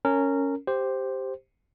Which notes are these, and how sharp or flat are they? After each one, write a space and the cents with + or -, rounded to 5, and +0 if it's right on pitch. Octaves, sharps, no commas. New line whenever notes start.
C#4 +0 A#4 -20
G4 +0 C5 +0